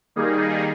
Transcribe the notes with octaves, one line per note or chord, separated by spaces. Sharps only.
D#3 G3 A#3 D#4 G#4